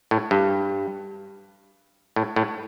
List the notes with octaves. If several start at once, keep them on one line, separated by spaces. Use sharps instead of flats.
A2
G2
A2
A2